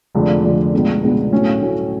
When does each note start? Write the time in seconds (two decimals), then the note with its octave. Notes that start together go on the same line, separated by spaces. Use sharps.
0.15 F1 F2 D3 G#3
0.44 F1 F2 D3 G#3
0.73 C#2 B2 G#3 B3 D4
1.03 C#2 B2 G#3 B3 D4
1.32 A2 F#3 A3 C#4
1.62 A2 F#3 A3 C#4